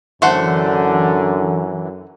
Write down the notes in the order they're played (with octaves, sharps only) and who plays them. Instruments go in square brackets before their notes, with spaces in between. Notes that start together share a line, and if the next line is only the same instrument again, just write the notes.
[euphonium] F#2 [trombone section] D3 [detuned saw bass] E3 [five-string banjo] A3 C5 F#5